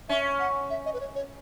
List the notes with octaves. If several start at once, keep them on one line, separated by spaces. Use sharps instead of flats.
C#4 E5
F#5
E5
D#5
B4
C#5
C#5